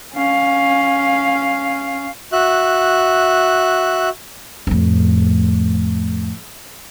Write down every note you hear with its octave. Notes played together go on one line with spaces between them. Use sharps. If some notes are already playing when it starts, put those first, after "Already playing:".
C#4 F5
F#4 E5 F#6
F2 A2